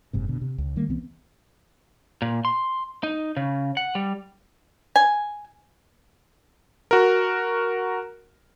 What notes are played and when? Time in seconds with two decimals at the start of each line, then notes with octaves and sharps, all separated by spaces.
0.13 F#1 G#2 C3
0.29 B2 D3
0.42 C3
0.58 C#2
0.76 D#3 G3 A3 A#3
0.88 C2 E3 B3 C4
2.22 A#2
2.45 C6
3.03 D#4
3.37 C#3
3.77 F#5
3.95 G3
4.96 G#5
6.91 F#4 A#4